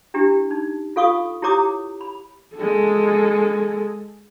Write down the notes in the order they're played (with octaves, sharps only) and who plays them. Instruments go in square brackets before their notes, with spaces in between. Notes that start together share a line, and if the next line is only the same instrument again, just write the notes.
[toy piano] D4 E4 G4
D#4
F4 A4 F5 C#6 D#6
E4 G4 C#5 A#5 D6 D#6
B5
[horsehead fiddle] G#3 A4